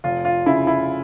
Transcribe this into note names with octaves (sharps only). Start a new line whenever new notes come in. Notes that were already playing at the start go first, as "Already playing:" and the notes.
F1 F4
F4
C#3 E4
E4